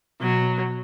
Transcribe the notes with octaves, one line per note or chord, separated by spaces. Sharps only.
B2 F#3